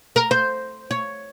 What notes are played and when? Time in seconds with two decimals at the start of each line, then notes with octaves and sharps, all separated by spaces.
0.16 A#4
0.31 C5
0.91 C#5